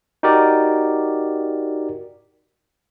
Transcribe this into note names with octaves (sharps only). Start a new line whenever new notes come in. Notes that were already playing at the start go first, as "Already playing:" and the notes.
D#4 F#4 G4 A#4 D5